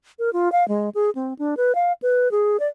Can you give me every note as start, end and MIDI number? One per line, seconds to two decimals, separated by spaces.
0.19 0.30 70
0.33 0.51 65
0.52 0.67 77
0.68 0.90 56
0.95 1.10 68
1.15 1.33 60
1.39 1.55 62
1.57 1.75 71
1.75 1.92 77
2.02 2.31 71
2.31 2.57 68
2.60 2.68 74